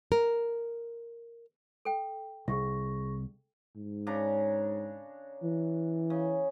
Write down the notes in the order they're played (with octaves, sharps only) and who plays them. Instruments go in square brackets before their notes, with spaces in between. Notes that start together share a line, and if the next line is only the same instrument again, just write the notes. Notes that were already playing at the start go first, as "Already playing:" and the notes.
[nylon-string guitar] A#4
[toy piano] A4 G5
[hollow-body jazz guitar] C2 [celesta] G#4 C#6 A#6
[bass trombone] G#2
[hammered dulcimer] C#3 D4 A#5
[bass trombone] E3
[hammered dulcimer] C#3